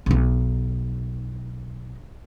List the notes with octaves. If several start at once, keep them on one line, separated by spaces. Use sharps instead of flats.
B1 D#4